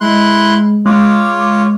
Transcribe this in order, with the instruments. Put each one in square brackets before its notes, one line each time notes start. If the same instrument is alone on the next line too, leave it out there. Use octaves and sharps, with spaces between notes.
[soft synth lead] G#3 [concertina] E4 C6 F#6
[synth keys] G#3 [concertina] F4 C#5 [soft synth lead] D6